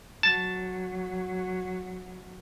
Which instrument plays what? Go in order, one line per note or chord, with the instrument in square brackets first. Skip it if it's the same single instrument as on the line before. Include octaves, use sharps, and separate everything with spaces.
[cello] F#3 [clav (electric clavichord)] A5